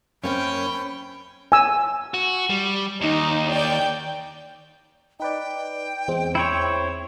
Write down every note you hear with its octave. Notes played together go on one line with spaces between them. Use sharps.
F#2 A#3 C4 C#4 C#5 G5 B5
G#5 E6
F#4
G3
D#2 D#4
D5 G5
D#4 B4 D5 G5
E2 G#3 C4
E4 C5 C#5